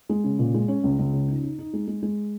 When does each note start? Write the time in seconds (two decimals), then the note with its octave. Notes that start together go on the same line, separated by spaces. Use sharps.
0.09 G#3
0.24 C#3
0.39 A#2
0.54 G#3
0.68 C#4
0.84 C#2
0.99 C#2
1.13 C#3
1.28 D#4
1.43 D#4
1.59 D#4
1.73 G#3
1.88 G#3
2.03 G#3